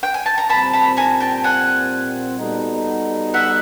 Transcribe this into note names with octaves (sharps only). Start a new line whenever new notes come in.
G5
G#5
A5
A#5
A#2 G3 C4 A5 B5
A5 B5
G#5 A#5
G5 A5
F#5 G#5
G3 B3 D#4 F#4 A4
E5 F#5